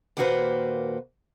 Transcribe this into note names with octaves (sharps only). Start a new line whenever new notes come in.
D#2 A#2 A#3 F#4 B4 C5